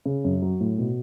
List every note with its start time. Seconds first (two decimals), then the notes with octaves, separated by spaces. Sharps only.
0.05 C#3
0.24 F#2
0.42 F#3
0.60 A2
0.78 B2